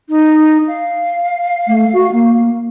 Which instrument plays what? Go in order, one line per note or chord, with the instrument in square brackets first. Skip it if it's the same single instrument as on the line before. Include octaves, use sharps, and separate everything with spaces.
[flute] D#4
F5
[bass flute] A3
F#4
A#3